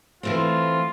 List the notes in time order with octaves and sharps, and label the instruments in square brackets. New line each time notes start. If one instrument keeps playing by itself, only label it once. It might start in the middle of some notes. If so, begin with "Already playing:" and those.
[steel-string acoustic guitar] E3 A3 C4 [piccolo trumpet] F4